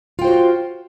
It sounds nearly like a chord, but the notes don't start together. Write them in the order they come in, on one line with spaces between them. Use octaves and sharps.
F4 G5 C5 F#4